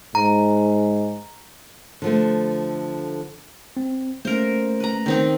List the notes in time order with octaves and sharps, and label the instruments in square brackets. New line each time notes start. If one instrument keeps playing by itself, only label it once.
[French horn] G#2 [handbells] A#5
[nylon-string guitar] D3 F3 A3
[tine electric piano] C4
[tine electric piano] A3 A#3 C#4 [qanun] A#4 C5
[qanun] B4 A#5
D#3 C4 D#4